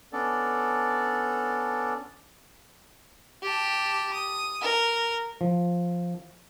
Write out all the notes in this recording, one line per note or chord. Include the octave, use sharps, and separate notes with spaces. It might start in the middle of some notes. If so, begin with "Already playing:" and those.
B3 C#4 D4 A4 D5
G4 A5
D#6
A#4
F3